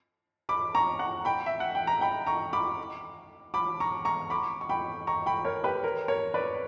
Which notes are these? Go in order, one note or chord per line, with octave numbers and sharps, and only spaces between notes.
B5 D6
A#5 C#6
F#5 A#5
G5 B5
E5
F#5
G5
A#5
G5 B5
A#5 C#6
B5 D6
B5 D6
A#5 C#6
A#5 C#6
B5 D6
C#6
G5 B5
A#5 C#6
G5 B5
A#4 C#5
G4 B4
A#4 C#5
A#4 C#5
B4 D5